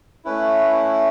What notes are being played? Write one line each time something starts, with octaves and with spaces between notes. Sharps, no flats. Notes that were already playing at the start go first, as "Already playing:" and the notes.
A3 C#4 E4 B4